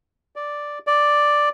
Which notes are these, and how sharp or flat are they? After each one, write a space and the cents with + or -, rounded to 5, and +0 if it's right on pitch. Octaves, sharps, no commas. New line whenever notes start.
D5 +0
D5 +5